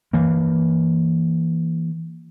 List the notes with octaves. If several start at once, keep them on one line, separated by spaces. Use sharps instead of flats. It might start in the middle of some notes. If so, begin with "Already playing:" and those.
E3 A#3